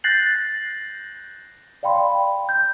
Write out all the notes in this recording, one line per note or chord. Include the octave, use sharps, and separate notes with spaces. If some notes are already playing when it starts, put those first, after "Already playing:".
F#6 G6 A6 A#6 C7 F#7
D5 F5 G5 B5 C6
G6